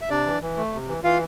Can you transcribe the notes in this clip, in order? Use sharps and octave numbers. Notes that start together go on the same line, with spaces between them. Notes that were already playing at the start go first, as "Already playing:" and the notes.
E5
C3 D4 D5
E3
E3
A3
C3
E3
E3 F4 F5